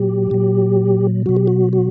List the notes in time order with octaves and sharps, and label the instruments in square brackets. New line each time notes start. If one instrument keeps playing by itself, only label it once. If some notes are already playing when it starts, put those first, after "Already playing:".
Already playing: [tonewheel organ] A#2 F#3 G4
A#2 F#3
B2 F#3 F#4
G4
F#4
F#4